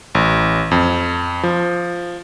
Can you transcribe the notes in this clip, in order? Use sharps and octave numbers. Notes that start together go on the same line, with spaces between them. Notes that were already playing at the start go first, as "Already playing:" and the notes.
A1
F2
F3